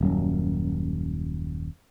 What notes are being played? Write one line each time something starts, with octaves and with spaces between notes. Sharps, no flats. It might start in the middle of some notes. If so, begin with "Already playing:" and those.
D#1 F#2 F#3